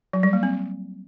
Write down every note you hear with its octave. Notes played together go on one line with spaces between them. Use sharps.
F#3
G3
A#3
C4